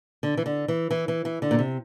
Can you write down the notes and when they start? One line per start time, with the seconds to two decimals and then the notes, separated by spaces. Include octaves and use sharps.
0.23 D3
0.37 E3
0.46 D3
0.68 E3
0.91 E3
1.08 E3
1.25 E3
1.42 D3
1.51 A#2
1.59 C3